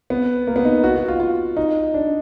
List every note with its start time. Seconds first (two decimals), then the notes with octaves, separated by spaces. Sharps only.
0.10 B3
0.47 A#3
0.56 B3
0.65 D#4
0.84 F#4
0.96 F#4
1.08 F4
1.20 F4
1.57 D#4
1.94 D4